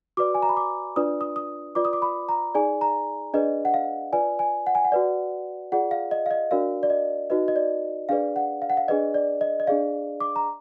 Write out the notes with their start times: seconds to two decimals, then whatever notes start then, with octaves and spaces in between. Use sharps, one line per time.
0.17 F#4 B4 D5 D6
0.35 G#5
0.42 A#5
0.49 B5
0.57 D6
0.96 D4 F4 B4 D5 D#6
1.21 D#6
1.36 D#6
1.75 F4 B4 D5 D6
1.85 D#6
1.93 D6
2.02 B5
2.29 A#5
2.55 D#4 G#4 D5 G#5
2.81 A#5
3.34 D4 G#4 B4 D5 D#5
3.65 F#5
3.74 F5
4.13 F4 B4 D5 G#5
4.39 G#5
4.67 F#5
4.75 G#5
4.85 F#5
4.92 F#4 B4 D5
5.72 F4 G#4 D5 F#5
5.91 F5
6.11 D#5
6.26 F5
6.31 D#5
6.51 D4 F#4 A#4 D5 F5
6.83 D5
6.90 D#5
7.30 D#4 F#4 B4 D#5
7.48 D#5
7.56 D5
8.09 D4 G#4 B4 D5 F5
8.36 F#5
8.62 F5
8.70 F#5
8.77 F5
8.88 D4 G#4 B4 D5 D#5
9.14 D5
9.41 D#5
9.60 D#5
9.67 D4 G#4 D5 F5
10.20 D6
10.36 A#5